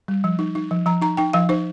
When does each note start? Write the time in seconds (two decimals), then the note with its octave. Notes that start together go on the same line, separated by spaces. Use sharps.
0.08 G3
0.24 F3
0.39 D#4
0.55 D#4
0.71 F3
0.86 F3 A#5
1.02 D#4 A#5
1.17 D#4 G5
1.33 F3 F5
1.49 D#4 C5